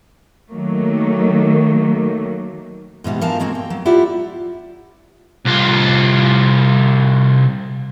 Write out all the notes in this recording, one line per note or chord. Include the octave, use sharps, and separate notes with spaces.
D#3 F#3 A3 A#3
G#2 B2 E3 G3
G2 E3 F3 A#4 F5 A5
G#3 A#3 C4 F#4
G5
F#3
E4 F4 G4 D5 F#5
C2 F4